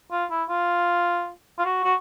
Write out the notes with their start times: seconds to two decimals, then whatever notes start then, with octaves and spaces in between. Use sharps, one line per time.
0.11 F4
0.31 E4
0.49 F4
1.59 F4
1.65 F#4
1.84 F#4